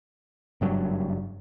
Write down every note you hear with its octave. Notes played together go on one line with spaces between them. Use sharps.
F#1 G2 F#3